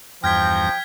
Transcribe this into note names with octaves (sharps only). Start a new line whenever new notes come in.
E2 G2 F3 G5 F6 G#6 A#6 B6